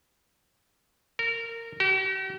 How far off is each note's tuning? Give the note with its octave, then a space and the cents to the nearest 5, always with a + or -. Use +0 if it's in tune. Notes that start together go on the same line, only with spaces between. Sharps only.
A#4 -20
G4 -45